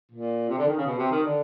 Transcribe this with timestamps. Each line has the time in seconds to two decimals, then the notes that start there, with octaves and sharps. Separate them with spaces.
0.12 A#2
0.49 C3
0.58 D3
0.67 D#3
0.77 C#3
0.86 B2
0.98 C3
1.11 D#3
1.24 D3